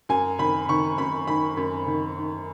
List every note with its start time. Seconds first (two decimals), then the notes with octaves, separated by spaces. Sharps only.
0.09 F#2 G#5
0.38 D#3 B5
0.69 D#3 C#6
0.98 F#2 B5
1.27 D#3 B5
1.57 F#2
1.87 D#3
2.17 D#3